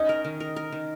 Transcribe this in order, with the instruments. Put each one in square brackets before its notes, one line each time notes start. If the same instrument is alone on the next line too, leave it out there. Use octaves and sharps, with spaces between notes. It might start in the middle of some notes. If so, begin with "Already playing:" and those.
Already playing: [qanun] C#4 D#4 G#4 [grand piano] D#5
[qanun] A#4
D#3
A#4
A#4
D#3